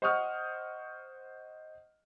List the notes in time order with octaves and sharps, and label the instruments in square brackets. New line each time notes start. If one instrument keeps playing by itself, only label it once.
[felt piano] C5 D#5 F#5 C#6 D#6 F6